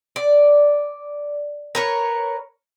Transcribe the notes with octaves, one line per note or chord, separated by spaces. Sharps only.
D5
A#4 B4 C#5